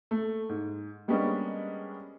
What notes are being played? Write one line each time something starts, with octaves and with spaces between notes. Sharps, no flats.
A3
G#2
G3 G#3 A#3 B3 C#4 D4